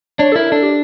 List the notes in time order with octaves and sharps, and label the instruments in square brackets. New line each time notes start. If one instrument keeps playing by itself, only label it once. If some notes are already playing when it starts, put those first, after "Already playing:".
[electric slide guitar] D4 [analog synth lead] C#5
[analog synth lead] A4
[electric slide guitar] E4 [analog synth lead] A#4
[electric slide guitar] D4 [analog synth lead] A4
[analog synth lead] G4